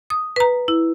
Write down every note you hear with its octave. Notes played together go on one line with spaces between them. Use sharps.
D#6
B4 A#5
E4